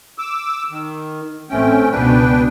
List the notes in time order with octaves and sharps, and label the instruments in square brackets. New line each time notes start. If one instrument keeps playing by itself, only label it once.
[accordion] D6 E6
D#3
[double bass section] A1 C4 [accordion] A3 C#4 G5
[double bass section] C#2 B2 B3 [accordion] D4 B4 G5